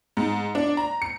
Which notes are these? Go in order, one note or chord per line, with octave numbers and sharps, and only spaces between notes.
G#2
D4
A#5
C#7